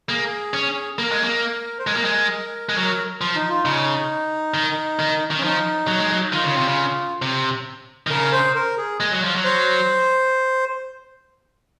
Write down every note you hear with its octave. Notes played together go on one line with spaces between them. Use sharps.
A#3 G#4
C#4
A#3 A#4
G#3
A#3
C5
G#3 A#4
A#3
G#3
G#3
F#3 A#4
F3
D#4
F4
C#3 D#4
D#3
D#3
D#3
C#4
F3 D#4
F#3
G#3
F#3
D#4
D#3 F4
C#3
C3
C#3
C3
D#3
C#3 A#4
C5
A#4
G#4
G#3
F#3
F3
F#3
C5